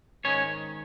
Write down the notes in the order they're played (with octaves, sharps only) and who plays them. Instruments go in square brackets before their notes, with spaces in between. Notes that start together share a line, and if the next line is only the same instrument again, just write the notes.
[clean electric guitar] G#2 D#3 G#3 C#4 C#5